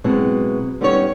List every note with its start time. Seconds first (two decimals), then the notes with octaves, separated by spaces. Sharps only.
0.04 B2 F#3 G#3 C4 E4 B4
0.81 G3 B3 C#4 D#4 E4 C#5